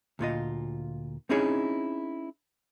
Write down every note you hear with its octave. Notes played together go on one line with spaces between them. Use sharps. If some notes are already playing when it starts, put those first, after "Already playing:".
D2 A#2 F4 D#5
C4 C#4 D#4 E4 G#4 C#5